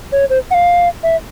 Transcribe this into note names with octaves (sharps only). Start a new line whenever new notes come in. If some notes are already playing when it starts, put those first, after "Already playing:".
C#5
C5
F#5
F5
E5